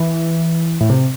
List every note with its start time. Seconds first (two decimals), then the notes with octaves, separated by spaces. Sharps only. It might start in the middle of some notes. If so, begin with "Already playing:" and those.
Already playing: E3
0.81 A2
0.90 C3